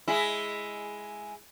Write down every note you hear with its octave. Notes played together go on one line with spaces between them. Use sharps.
G#3 E4